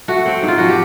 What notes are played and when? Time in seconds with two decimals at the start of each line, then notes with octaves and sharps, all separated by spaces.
0.08 A3 F#4
0.26 C4
0.43 G#2
0.48 F4
0.58 F3 F#4
0.68 G4